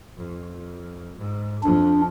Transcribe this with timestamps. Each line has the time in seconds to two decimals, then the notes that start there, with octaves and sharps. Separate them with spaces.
0.17 F2
1.17 G#2
1.63 F2 F3 D4